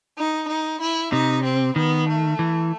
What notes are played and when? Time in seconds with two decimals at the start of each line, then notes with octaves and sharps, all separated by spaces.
0.17 D#4
0.49 D#4
0.81 E4
1.12 C3 D#4
1.44 C4
1.76 D#3 B3
2.08 A3
2.39 E3